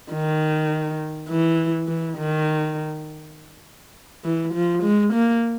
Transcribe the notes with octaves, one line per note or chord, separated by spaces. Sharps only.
D#3
E3
E3
D#3
E3
F3
G#3
A#3